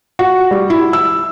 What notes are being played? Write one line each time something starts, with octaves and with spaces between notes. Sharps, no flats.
F#4
G3
E4
E6